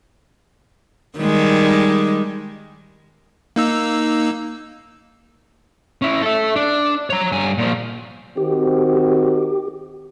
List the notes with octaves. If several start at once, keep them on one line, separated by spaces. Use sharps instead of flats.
D#3 G3 G#3
A#3 D#4 E6
C#4 E4
A4 E5
D4
C#5 A#5
G2 G#5
A#2 F3
D#3 C4 F#4 G4